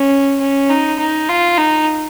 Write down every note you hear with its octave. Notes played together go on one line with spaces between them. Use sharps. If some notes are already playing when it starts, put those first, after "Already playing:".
Already playing: C#4
C#4
D#4
D#4
F4
D#4